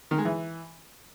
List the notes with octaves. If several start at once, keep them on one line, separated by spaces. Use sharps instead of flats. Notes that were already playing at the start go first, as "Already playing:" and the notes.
D#3
G#3
E3